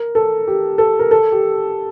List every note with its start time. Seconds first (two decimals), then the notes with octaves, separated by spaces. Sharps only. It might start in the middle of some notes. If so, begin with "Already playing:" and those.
Already playing: A#4
0.15 A4
0.48 G4
0.78 A4
0.99 A#4
1.11 A4
1.32 G4